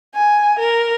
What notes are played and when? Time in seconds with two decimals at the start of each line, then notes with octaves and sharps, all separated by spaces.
0.15 G#5
0.59 A#4